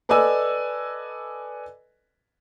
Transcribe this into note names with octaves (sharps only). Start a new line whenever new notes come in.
A4 B4 D5 D#5 G#5 E6